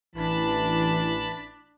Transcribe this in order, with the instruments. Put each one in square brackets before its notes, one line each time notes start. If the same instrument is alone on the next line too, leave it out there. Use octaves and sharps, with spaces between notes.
[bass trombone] A1 [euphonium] E3 [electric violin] D4 [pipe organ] A5 B5